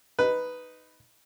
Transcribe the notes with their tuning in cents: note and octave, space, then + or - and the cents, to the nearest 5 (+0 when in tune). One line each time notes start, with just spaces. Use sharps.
D#4 +0 B4 +5